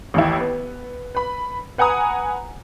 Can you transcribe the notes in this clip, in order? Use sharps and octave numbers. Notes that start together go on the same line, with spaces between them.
A1 D#2 E4
B3
B4 B5
B4 F#5 G#5 A#5 D#6